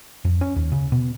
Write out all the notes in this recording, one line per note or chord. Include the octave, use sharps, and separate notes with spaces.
F2
C#4
D#2
C#3
B2